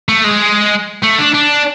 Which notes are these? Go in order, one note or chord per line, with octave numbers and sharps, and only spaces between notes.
A3
G#3
A3
D4
D4